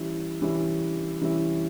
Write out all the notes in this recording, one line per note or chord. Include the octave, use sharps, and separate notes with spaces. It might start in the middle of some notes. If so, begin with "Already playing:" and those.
Already playing: E3 G3 C#4 E4
E3 G3 C#4 E4
E3 G3 C#4 E4